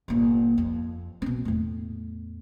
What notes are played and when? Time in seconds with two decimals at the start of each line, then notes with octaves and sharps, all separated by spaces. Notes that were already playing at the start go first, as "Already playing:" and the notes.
0.08 G1 A#2
0.58 F2
1.22 B2 C4
1.45 E2 A2